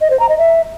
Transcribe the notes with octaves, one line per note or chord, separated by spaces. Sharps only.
D#5
C5
A#5
D#5
E5